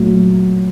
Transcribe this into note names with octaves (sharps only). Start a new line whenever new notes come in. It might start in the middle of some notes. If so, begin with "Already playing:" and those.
Already playing: A#2 F#3 A3